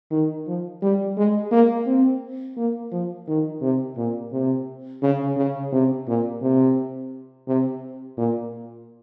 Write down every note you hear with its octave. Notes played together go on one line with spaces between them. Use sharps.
D#3
F3
G3
G#3
A#3
C4
A#3
F3
D#3
C3
A#2
C3
C#3
C#3
C3
A#2
C3
C3
A#2